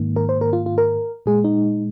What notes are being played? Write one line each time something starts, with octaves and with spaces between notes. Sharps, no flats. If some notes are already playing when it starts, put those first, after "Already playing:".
Already playing: G#2 D#3 A#3
A#4
C5
A#4
F4
F4
A#4
A#2 G#3 G#4
D#4